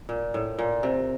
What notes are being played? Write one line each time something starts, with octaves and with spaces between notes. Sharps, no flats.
A#2
A2
A#2
C3